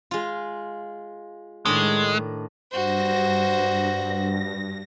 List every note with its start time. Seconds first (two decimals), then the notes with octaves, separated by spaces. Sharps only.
0.11 G#3 F4
1.65 A2 D#3 G#3 D4
2.72 G2 F#4 C5 A#6